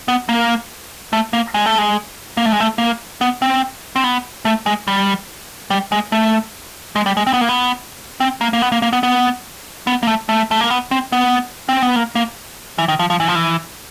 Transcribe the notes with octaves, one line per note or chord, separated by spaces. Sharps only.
B3
A#3
A3
A#3
G#3
A3
G#3
A#3
A3
G#3
A3
A#3
B3
C4
C4
B3
A3
G#3
G3
G3
G#3
A3
G#3
G3
G#3
C4
B3
A#3
B3
C4
A#3
A#3
B3
A#3
A#3
B3
B3
B3
A#3
A3
A3
A3
A#3
B3
C4
B3
C4
B3
A#3
A#3
E3
D#3
F3
F3
E3
F3
E3